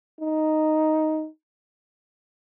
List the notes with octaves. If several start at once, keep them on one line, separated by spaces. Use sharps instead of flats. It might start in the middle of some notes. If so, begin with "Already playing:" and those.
D#4